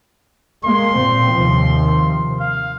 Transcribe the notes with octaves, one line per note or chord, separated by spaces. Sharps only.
G#3 A#3 C6
A#2 C4
D#2 C3 F3
F5